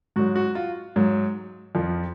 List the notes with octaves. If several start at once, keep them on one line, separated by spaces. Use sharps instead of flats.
G#2 F#3 F#4
F#4
F4
G#2 F#3
F2 F3